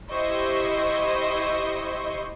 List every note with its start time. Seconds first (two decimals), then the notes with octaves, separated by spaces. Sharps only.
0.10 E4 G4 C5 D#5 C#6